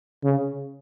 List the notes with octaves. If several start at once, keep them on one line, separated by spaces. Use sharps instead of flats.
C#3